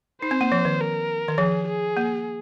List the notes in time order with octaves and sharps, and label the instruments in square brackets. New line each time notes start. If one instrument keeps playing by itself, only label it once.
[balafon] D#4 [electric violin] C5
[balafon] C4
A#3
F3
D#3
[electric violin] A#4
[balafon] D#3
[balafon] F3 [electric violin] G#4
[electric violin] G#4
[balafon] A#3